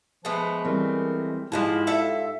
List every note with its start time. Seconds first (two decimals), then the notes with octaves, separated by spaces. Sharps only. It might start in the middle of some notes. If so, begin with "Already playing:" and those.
0.25 F3 G#3 A3 B3
0.64 E3 G3 C4 A#4
1.52 G#2 F3 G#3 E4 F4 G4 A5
1.87 A4 E5 A5